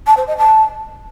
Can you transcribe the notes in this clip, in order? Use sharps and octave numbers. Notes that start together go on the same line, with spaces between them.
A5
C5
D#5
A5